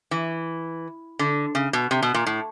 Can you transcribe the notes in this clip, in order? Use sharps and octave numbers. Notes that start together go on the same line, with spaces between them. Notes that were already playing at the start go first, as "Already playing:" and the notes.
E3
D3
C#3
B2
C3
B2
A#2
A2